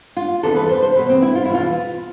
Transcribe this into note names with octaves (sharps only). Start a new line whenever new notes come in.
F4
E2 C3 E3 A4
B4
C5
C5
E2 B2 B4
C4
E4
F4
E2 B2 E4
F4